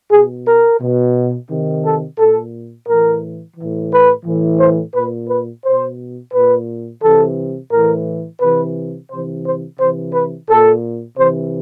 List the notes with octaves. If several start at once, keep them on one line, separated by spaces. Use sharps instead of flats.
B2 G#4
A#4
B2
C3 D#3
A4
A#2 A4
A2 E3 A#4
A2 E3
B4
A2 E3
C5
A#2 B4
B4
B2 C5
A#2 B4
C3 E3 A4
A2 E3 A#4
C3 E3 B4
C3 E3 C5
C5
C3 E3 C5
B4
A#2 A4
C3 E3 C5